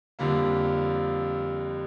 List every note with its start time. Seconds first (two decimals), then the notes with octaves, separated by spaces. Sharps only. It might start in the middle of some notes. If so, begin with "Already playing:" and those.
0.19 F2 D3 G3 A#3